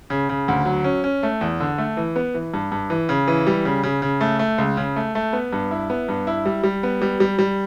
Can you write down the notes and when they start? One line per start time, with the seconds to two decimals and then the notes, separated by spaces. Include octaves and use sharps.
0.10 C#3
0.29 C#3
0.48 D2
0.66 F#3
0.84 C#4
1.04 C#4
1.23 A3
1.41 E2
1.60 D3
1.78 A3
1.97 E3
2.16 B3
2.34 E3
2.54 G2
2.72 G2
2.90 E3
3.09 C#3
3.28 E3
3.47 G3
3.65 C#3
3.83 C#3
4.02 C#3
4.21 A3
4.39 A3
4.58 C#2
4.77 C#3
4.96 A3
5.15 A3
5.33 B3
5.53 G2
5.71 E4
5.90 B3
6.09 G2
6.27 E4
6.46 G3
6.64 G3
6.83 B3
7.02 G3
7.20 G3
7.39 G3